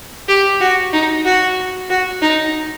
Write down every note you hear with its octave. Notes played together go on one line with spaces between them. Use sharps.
G4
F#4
D#4
F#4
F#4
D#4